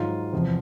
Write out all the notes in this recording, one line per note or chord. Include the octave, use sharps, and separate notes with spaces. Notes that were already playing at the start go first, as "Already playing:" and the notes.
Already playing: G#2 D#3 F#3 F4
E2 C3 F3